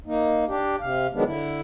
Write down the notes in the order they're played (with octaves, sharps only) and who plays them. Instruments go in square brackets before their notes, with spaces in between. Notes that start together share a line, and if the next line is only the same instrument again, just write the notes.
[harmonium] A#3 D#4
D4 G4
C3 F5
D#3 F#3 G#3 B3 D4
D3 E4